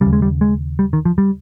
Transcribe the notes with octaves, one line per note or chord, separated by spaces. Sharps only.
D#2 C#3 G3
G#3
G3
G#3
G3
D#3
F3
G3